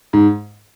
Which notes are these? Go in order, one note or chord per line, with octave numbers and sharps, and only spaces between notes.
G#2